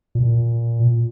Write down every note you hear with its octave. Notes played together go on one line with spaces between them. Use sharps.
A#2